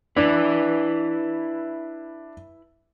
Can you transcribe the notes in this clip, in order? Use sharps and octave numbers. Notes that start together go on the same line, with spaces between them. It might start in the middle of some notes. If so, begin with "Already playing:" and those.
D4 E4 B4